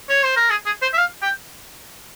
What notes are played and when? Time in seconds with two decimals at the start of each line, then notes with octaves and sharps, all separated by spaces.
0.09 C#5
0.23 C5
0.36 A#4
0.50 G#4
0.66 G#4
0.82 C5
0.93 E5
0.98 F5
1.22 G5